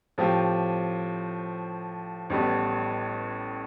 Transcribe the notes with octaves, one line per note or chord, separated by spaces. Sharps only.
A2 F3 C4 G4
A1 A2 G3 B3